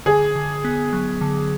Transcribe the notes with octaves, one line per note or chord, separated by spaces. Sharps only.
D3 G#4
D3
B3
F#3
D3